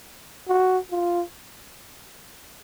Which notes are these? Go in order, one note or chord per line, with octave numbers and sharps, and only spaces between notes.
F#4
F4